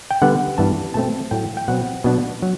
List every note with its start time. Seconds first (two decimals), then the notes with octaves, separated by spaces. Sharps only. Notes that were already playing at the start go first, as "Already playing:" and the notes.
0.11 G5
0.22 D3 G3 B3 F#5
0.58 G2 E3 B3 D4 A5
0.94 B2 A3 C4 A5
1.31 A2 F#3 A3 G5
1.57 G5
1.68 B2 F#3 C4 F#5
2.04 B2 F#3 B3 D4
2.42 F#3